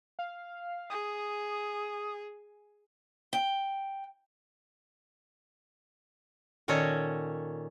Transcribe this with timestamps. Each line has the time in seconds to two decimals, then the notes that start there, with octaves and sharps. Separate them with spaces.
0.19 F5
0.90 G#4 D#6
3.33 G5
6.68 A#2 D#3 C#4 A4 C#5 D#5